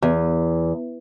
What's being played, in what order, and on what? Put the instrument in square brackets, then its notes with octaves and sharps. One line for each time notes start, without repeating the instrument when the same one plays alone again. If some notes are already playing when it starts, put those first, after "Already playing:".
[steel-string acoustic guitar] E2